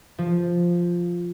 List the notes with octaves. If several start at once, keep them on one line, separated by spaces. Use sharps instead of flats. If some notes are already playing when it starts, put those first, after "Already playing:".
F3